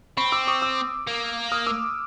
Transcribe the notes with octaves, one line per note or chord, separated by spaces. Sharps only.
C4 B5 C#6
D6 E6
C#6 D#6
D6 E6
A#3
D#6 F6
D6 E6